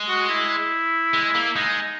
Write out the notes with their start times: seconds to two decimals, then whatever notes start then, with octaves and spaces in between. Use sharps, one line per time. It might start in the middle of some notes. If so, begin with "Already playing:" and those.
Already playing: G#3
0.09 F#4
0.29 E4
1.14 G#3
1.35 A#3
1.56 G#3 D#4